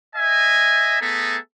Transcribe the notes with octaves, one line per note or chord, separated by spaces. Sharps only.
D#5 E5 G#5
A3 B3 G#4 A4 E5 A#5